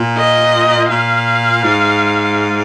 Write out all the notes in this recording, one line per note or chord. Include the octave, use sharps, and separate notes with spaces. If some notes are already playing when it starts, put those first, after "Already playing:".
Already playing: A#2
D#5
A#2 F5
G#2